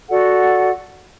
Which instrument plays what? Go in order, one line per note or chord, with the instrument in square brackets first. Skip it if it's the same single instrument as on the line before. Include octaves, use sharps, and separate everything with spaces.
[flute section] F#4 A4 D5 F#5